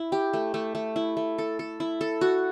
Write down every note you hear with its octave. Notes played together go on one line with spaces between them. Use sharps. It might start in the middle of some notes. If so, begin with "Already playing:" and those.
Already playing: E4
G4
A3
A3
A3
E4
A3
A4
A4
E4
A4
F#4